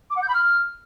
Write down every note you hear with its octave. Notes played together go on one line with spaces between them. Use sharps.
D6
F#5
G6
B5
F6